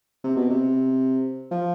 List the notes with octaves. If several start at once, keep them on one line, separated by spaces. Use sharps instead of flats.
C3
B2
C3
F3